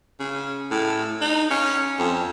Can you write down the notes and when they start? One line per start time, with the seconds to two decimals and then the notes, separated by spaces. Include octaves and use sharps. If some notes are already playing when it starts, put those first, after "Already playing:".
0.20 C#3
0.71 A2
1.21 D#4
1.51 C#4
1.99 F2